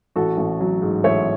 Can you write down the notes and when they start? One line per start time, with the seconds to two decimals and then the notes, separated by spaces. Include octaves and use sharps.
0.16 A1 F#4 A4
0.38 A1
0.60 F#3
0.82 G#2
1.04 A1 C#5 E5